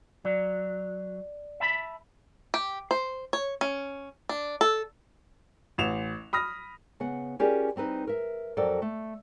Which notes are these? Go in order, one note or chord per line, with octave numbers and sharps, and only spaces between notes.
F#3 D5
E5 A5 B5
G4
C5
C#5
C#4
D4
A4
A1 E7 F7
B5 D#6 F6 A#6
C#3 B3 F#5
C#4 F4 G4 G#4 A#4 D5
G3 C4 D#4 B4
A#4 E5
F2 F#3 A4 A#4 D5 G5
A3